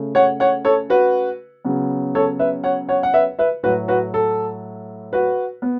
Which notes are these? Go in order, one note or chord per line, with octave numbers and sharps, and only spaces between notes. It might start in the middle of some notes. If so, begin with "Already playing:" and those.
Already playing: C#3 A3
C#5 F#5
C#5 F#5
A4 C#5
F#4 B4
C#3 F#3 B3
A4 C#5
B4 E5
C#5 F#5
C#5 F#5
F#5
B4 E5
B4 E5
A2 F#3 A3 F#4 B4
F#4 B4
A4
F#4 B4
B3